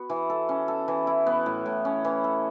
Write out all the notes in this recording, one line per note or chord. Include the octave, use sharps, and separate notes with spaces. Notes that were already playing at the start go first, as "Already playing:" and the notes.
Already playing: B3 F#4
E3
A4
C#4
A4
E3
E4
B3
A2
A2
C#4
E3
A4